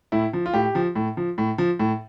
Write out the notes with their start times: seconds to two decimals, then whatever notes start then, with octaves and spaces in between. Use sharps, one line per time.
0.12 A2 E4
0.33 F3
0.46 F4
0.53 A2 G4
0.75 F3
0.96 A2
1.17 F3
1.38 A2
1.58 F3
1.79 A2